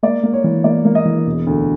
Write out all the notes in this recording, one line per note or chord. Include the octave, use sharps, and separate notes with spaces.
A#3 D5
A#3
C#5
E3
A#3 D5
A#3
D#5
E3
E1
D2